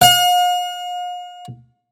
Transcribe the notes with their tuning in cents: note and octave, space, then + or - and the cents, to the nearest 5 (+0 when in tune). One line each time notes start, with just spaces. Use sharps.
F5 +45